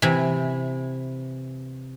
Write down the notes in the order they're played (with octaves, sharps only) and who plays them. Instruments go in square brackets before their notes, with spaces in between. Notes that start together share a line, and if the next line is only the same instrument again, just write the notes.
[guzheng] C3 E3